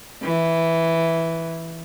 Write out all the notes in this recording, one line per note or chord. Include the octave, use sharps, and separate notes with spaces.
E3